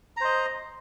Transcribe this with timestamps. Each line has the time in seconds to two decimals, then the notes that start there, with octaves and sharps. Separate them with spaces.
0.17 A#5
0.21 C5
0.25 D#5